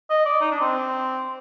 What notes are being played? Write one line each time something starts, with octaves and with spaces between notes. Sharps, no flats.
D#5
D5
D#4
D4
C4